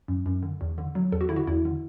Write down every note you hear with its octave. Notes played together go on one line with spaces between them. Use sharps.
F#2
F#2
D3
E2
D3
F#3
E2 A4
F#4
D3 E4
F#4
E2 E4
D3